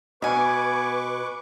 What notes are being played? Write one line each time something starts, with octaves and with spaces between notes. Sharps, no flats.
B2 B4 G#5 C#6 D6